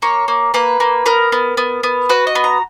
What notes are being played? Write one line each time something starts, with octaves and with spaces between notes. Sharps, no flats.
A#3 C#5
A#3
A#3 B4
A#3
B3 A#4
B3
B3
B3
F#4 B4
D#5
B3
A#5